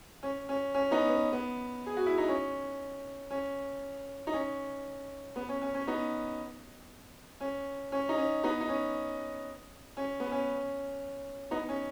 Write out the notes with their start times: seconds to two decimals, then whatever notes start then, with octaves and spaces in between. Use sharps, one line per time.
0.23 C#4
0.49 C#4
0.75 C#4
0.91 B3 D#4
1.09 B3
1.32 B3
1.86 G#4
1.97 F#4
2.06 E4
2.18 D#4
2.28 C#4
3.31 C#4
4.27 D#4
4.33 C#4
5.36 B3
5.49 C#4
5.62 C#4
5.74 C#4
5.87 B3 D#4
7.40 C#4
7.92 C#4
8.09 D#4
8.18 C#4
8.43 B3 D#4
8.61 D#4
8.69 C#4
9.97 C#4
10.20 B3
10.32 C#4
11.51 B3 D#4
11.69 C#4